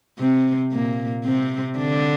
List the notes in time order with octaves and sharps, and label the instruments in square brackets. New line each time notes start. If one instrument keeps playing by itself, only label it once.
[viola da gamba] C3 C4
A#2 A#3
C3 C4
D3 D4